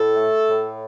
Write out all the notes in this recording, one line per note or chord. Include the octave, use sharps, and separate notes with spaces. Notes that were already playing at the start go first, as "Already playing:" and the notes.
Already playing: A2 A4
A3
A2